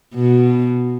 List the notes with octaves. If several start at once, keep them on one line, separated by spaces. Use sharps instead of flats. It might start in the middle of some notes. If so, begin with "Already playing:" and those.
B2